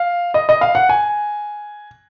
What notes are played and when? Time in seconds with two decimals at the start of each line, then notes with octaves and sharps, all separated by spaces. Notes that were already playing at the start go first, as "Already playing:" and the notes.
Already playing: F5
0.34 D#5
0.49 D#5
0.61 F5
0.75 F#5
0.89 G#5